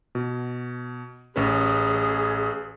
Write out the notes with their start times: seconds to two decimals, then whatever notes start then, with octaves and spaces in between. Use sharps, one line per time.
0.15 B2
1.36 A1 C#4 G#4 B4